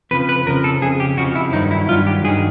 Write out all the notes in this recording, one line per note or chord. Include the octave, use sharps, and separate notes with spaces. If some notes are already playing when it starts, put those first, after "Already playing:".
F2 C#3 F3 B4
B4
F2 C#3 F3 A#4
A4
F2 C#3 G#4
G4
F2 C#3 F3 F#4
E4
G2 D#3 F#3 D#4
E4
G2 D#3 F#3 F4
G4
G2 D#3 F#3 G#4